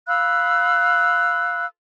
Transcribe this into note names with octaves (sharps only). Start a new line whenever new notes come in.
F5 B5 E6 F#6